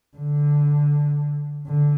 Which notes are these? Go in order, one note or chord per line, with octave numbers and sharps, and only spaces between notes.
D3
D3